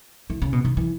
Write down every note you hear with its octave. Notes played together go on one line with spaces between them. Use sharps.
E3
C#3
B2
D#3
E3